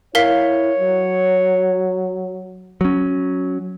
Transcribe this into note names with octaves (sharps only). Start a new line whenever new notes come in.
E4 A#4 C#5 F5 B6
F#3
F#3 C#4